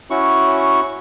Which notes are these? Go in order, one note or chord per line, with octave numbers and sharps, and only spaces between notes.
C#4 E4 F#4 C#6